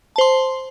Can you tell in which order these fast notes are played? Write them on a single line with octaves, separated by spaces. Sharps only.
A5 C5 C6